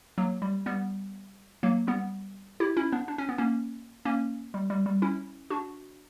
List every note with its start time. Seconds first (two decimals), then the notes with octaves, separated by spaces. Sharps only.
0.18 F#3 A#3
0.42 G3
0.66 G3 B3
1.63 F#3 A#3
1.87 G3 B3
2.60 E4 G4
2.77 C#4 E4
2.92 B3 D4
3.08 D4
3.18 C#4
3.29 B3
3.38 A#3 C#4
4.05 A#3 C#4
4.54 G3
4.70 G3
4.86 G3
5.02 C#4 E4
5.50 D4 F#4